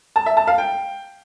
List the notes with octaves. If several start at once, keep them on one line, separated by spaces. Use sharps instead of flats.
A5
E5
A5
F5
G5